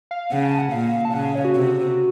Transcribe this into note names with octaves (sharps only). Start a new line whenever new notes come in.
F5
C#3 F#5
A5
F#5
A#2 F5
A5
C#3 F#5
F5
C#5
F#4
C3